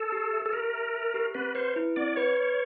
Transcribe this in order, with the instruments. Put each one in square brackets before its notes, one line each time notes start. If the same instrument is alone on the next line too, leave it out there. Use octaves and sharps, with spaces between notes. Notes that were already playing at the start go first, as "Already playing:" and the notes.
Already playing: [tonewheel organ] A4
[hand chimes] G4
E5
[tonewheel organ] A4
[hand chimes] G4 [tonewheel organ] A#4
[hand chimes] E5
E5
G4
[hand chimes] C4 [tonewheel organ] B4
[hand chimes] B4 [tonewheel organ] C5
[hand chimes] E4
[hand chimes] C4 [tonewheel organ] D5
[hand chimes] B4 [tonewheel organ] C#5
[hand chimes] B4